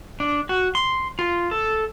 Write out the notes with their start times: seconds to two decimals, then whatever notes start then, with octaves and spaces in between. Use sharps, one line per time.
0.20 D4
0.49 F#4
0.75 C6
1.19 F4
1.51 A4